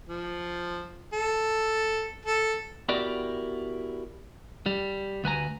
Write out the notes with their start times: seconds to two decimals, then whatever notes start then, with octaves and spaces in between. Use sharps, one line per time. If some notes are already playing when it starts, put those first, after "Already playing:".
0.09 F3
1.13 A4
2.26 A4
2.88 B3 E4 F#4 G4 A#4 D5
4.66 G3
5.24 D2 B4 G#5 A#5